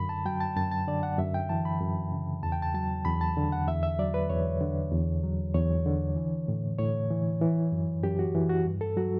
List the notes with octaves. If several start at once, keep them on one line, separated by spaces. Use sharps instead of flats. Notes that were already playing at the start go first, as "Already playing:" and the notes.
Already playing: F#2 D3 B5
A5
F#3 G5
A5
F#2 A5
A5
D3 D5
F#5
F#2 E5
G5
E3 A5
B5
F#2
C#3
E2 A5
G5
A5
F#3 A5
E2 B5
A5
D3
F#5
E2 E5
E5
F#3 D5
B4
E2 C#5
D3
E2
F#3
E2 C#5
D3
E3
A2
A2 C#5
E3
E3
F#2
F#2 G4
F#4
E3
F#4
G2
A4
F#3 F#4